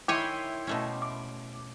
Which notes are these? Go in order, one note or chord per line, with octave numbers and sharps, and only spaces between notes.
D#3 E4 C#5 G5 G#5 C6 D6
B2 A3 C#4
D6